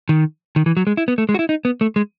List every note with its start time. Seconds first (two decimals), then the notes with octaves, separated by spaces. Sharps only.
0.09 D#3
0.56 D#3
0.66 E3
0.77 F#3
0.87 G#3
0.97 E4
1.08 B3
1.18 A3
1.29 G#3
1.34 F#4
1.39 E4
1.49 D#4
1.65 B3
1.81 A3
1.96 G#3